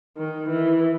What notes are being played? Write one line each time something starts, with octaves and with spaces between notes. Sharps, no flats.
D#3
E3